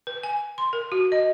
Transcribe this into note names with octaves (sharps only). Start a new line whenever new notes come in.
B4
G#5
C6
A#4
F#4
D#5